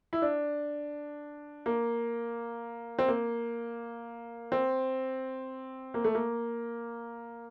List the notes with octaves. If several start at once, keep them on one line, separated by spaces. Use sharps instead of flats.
E4
D4
A#3
C4
A#3
C4
A#3
A3
A#3